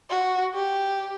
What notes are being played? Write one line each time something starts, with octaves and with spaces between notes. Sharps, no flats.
F#4
G4